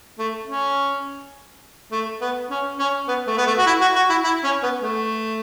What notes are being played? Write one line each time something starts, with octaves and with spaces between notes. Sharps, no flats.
A3
C#4
A3
B3
C#4
C#4
B3
A3
B3
A3
F#4
E4
F#4
F#4
E4
E4
C#4
B3
A3